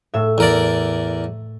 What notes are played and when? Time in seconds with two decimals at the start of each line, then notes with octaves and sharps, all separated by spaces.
0.14 A2 E5
0.38 E2 A#4 D5